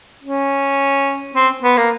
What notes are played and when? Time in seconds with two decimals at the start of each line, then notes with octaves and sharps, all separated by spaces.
0.22 C#4
1.35 C4
1.63 B3
1.77 A#3